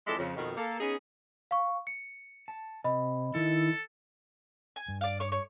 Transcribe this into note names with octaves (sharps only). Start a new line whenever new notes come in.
F2 E3 G#3 A4 D5 E5
F2 C#3
F2 B2 D#3
A#3 A4
B3 C#4 D#4 G#4
F5 C#6
C#7
A5
C3 D#5 B5
D#3 E4 A4
G#5
G2
D5 F5
C#5 D6
C#5